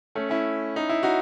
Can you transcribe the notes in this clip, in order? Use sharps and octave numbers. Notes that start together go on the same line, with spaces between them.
A3 C#4
C#4 E4
D#4
E4
D#4 F#4